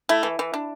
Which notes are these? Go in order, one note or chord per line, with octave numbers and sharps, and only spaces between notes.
A3 E4
E3
E3
D4